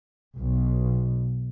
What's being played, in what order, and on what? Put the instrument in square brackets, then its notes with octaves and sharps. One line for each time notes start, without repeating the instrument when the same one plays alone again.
[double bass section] B1